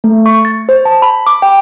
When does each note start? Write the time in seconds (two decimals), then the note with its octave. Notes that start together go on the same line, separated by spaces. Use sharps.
0.04 A3
0.26 C#6
0.45 A6
0.69 C5
0.85 A5
1.02 B5
1.27 D6
1.42 G5